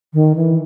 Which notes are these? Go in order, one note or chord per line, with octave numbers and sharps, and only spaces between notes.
D#3
E3